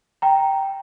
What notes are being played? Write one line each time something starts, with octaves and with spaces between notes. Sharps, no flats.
G5 A#5